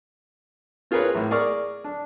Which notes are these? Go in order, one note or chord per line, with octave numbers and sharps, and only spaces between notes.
C4 F4 G#4 A#4 B4 C#5
A1 A2
G#4 A#4 D5 C#6 F6
D4